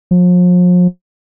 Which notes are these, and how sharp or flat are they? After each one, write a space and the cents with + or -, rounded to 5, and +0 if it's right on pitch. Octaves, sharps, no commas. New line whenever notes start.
F3 +40